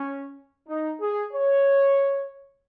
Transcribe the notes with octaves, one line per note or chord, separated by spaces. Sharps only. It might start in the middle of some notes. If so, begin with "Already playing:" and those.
Already playing: C#4
D#4
G#4
C#5